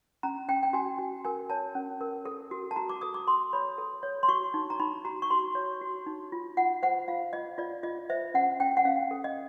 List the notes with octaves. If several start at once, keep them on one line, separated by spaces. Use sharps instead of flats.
C#4 A#5
C#4 G5
G5
F#4 G#5
F#4
A#4 G#5
C#5 A5
C#4
A#4
A4
F#4
A5
F#4 A#5
D6
A4 D#6
D6
A4 C6
C#5 B5
A4
C#5
C6
F#4 C#6
D#4
A#5
D#4 B5
F#4 A#5
C#6
F#4 C6
C#5
F#4
D#4
F4
F4 F#5
C5 F#5
F4 F5
F4 D#5
F4 D5
F4 D#5
C5 E5
C#4 F#5
C#4 G5
F#5
C#4 F5
A4
D#5